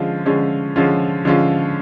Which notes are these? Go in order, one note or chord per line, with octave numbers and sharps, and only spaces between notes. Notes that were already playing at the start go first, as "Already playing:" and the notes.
Already playing: D3 F3 G#3 C#4 F4
D3 F3 G#3 C#4 F4
D3 F3 G#3 C#4 F4
D3 F3 G#3 C#4 F4